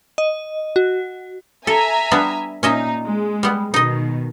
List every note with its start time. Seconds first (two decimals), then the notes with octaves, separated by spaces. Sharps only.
0.18 D#5
0.76 F#4
1.67 A4 E5 G#5 A#5
2.11 G3 B3 D4
2.63 A#2 C#4 D#4 D#5 E5
3.06 G#3
3.43 G3 B3
3.74 B2 D#3 D#4 D#5